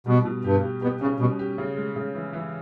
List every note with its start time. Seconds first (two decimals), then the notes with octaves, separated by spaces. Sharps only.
0.06 B2 G3
0.25 B2
0.44 G2 G4
0.63 G4
0.82 B2 G4
1.01 C#3 C#4
1.20 B2 G3
1.39 G4
1.58 C#3
1.77 G#3
1.96 C#3
2.15 E3
2.33 E3